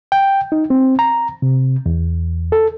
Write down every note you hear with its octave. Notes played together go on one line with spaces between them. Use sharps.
G5
D#4
C4
A#5
C3
E2
A4